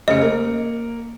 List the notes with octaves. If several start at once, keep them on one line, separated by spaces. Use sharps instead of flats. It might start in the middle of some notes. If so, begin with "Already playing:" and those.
F1 C#3 D#5 C#7
A#3